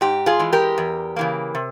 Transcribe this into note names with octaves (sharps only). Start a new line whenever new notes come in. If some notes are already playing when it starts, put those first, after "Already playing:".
G#2 G4
F4 G#4
E3 G#3
G4 A#4
E2
C#3 E3 A#3
C3